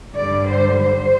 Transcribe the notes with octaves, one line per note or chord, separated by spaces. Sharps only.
G2 D3 G3 D5
C5
C5